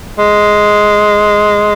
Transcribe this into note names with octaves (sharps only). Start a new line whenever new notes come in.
G#3